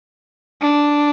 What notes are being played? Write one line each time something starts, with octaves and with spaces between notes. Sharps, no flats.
D4